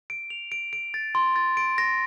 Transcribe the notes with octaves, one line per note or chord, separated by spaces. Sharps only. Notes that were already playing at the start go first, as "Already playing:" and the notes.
D7
F7
D7
D7
A6
C6
A6
D7
A#6